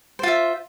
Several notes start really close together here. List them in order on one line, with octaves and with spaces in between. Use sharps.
C5 F4 E5